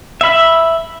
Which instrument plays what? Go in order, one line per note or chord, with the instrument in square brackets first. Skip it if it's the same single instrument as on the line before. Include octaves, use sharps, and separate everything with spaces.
[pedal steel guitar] E5 B5